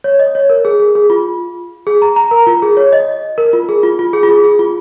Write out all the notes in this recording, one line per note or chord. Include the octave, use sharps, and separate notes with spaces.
C#5
D#5
C#5
A#4
G#4
G#4
G#4
F4
G#4
A#5
A#5
A#4
F4
G#4
C#5
D#5
A#4
F4
G#4
F4
F4
G#4
F4
G#4
G#4
F4